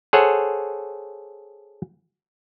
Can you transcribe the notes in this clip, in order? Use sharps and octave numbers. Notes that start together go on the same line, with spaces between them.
G#4 A4 C5 C#5 F#5